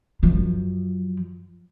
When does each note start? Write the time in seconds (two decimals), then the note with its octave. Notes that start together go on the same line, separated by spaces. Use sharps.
0.23 F#2 F3